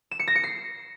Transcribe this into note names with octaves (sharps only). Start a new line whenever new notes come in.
E7
C#7
A#6
C#7
C7